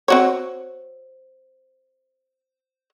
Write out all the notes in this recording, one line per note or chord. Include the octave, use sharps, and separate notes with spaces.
C4 F#4 C#5